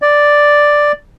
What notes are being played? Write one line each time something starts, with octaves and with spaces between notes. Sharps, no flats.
D5